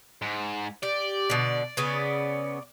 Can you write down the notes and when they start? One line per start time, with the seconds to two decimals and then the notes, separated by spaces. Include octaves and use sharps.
0.22 G#2
0.83 G4 D5
1.30 B2 D3
1.77 C#3 B3 C#4